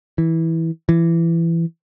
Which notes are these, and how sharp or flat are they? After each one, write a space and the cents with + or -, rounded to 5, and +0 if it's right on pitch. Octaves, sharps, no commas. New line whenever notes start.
E3 -15
E3 +20